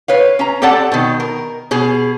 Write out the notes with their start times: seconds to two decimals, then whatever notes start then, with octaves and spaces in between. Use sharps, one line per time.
0.08 B4 C#5 F5
0.39 C#4 A#5
0.62 C4 G4 A4 D5 F#5 A5
0.92 B2 D#3
1.20 A#4
1.71 B2 G#4